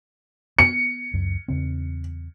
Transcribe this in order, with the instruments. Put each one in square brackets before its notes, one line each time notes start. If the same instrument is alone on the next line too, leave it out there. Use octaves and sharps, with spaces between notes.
[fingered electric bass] B3 [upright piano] C#7
[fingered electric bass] C#2 F#2
E2 C#3 C4